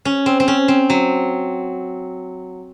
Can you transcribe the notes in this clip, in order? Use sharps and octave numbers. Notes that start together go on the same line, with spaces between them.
C#4
C4
C4
C#4
C4
F#3